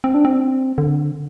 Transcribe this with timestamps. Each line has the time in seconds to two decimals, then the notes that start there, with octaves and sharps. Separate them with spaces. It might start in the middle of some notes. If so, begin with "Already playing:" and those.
0.04 C4
0.14 D4
0.25 C4
0.78 D3